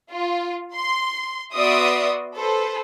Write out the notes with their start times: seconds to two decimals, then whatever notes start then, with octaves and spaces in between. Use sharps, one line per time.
0.10 F4
0.73 C6
1.54 B3 F#4 D5 E5 C6 D#6
2.34 A4 B4 C5